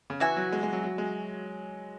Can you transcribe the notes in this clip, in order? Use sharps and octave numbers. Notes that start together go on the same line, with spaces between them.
C#3
E3 F#4 E5 G#5
F#3
G#3
G#3
F#3
F#3
G#3